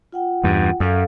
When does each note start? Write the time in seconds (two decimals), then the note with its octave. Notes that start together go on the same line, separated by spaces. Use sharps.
0.12 F4 F#5 G5
0.44 E2 G2
0.80 F#2 A4 F5